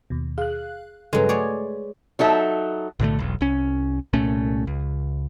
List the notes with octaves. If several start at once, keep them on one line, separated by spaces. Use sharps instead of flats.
D#2 B2
G#4 F5 F#6
G2 C#3 F#3 G#3 A4 B4
A3 G#4 C#5 D5
F#3 D#4 A4 E5
B1 A2 D3 A3
E1 B1
C2 C#4
C2 A#2 A3 C#4
C#2